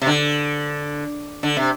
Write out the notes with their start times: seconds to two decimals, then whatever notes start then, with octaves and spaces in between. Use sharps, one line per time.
0.02 C3
0.07 D3
1.43 D3
1.57 C3